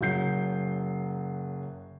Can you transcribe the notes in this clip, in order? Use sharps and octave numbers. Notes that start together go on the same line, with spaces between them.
F#1 F#3 G6 C7